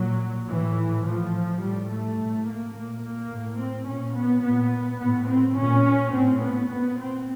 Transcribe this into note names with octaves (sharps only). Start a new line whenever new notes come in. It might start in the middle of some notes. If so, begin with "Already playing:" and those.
Already playing: A#2 F#3
A2 E3
A2 F3
A2 G3
A3
A2
A#3
A#2 A#3
A#3
A2
C4
A#2 C#4
B3
A#2 B3
A2 B3
C4
A#2 C#4
A2 C4
B3
A#2 B3
C4